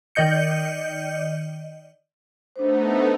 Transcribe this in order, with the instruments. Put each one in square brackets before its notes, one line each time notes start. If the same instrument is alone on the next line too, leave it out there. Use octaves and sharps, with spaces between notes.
[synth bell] D#3 D5 D#5 G6 C#7
[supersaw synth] A3 B3 D#4 [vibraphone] D4 C5